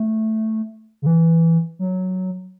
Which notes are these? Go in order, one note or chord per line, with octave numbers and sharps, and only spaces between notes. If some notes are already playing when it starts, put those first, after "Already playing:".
Already playing: A3
C#3
E3
F#3